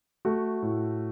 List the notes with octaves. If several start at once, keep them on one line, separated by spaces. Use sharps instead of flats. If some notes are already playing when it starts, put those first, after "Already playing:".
A3 F#4
A2